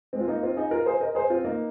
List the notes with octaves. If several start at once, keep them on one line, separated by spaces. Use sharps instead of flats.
G#3 C4
F4
A#3 D#4
C4 F4
D#4 G#4
F4 A#4
G#4 C5
A#4 D#5
G#4 C5
C4 F4
A#3 D#4